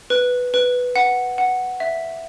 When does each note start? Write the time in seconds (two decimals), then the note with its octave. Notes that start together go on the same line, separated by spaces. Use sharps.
0.10 B4
0.54 B4
0.96 F#5
1.38 F#5
1.80 E5